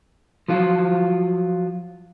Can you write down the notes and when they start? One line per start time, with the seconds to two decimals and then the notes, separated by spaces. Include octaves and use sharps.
0.48 F3 F#3 F4